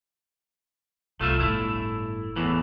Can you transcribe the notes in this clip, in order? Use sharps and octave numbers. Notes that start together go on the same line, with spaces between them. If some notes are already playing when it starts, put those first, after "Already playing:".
C2 A3 F4 E5
G1 A2 A3 E4
E2 A2 E3